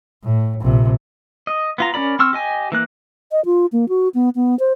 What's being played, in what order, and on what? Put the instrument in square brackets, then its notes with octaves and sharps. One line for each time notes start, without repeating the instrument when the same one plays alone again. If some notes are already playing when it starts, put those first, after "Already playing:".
[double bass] A2
A#1 C3
[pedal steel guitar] D#5
B3 F4 A#5
C#4 A#4 D5 B5
C4 C6 C#6 E6 F6
G4 D#5 G#5
E3 A#3 F#6
[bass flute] D#5
F4
A#3
F#4
B3
B3
C5